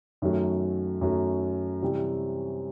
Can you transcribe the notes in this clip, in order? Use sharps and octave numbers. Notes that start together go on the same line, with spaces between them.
F#2 D#3 F#3 A3
F#2 D#3 F#3 A3
C3 E3 G3 C4